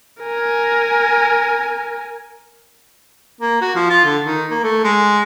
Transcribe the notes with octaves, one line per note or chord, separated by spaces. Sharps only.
A#4 G#5
A#3
F#4
F3
F4
D3
D#3
A#3
A3
G#3